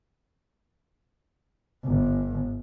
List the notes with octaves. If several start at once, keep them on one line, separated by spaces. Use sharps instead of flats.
G1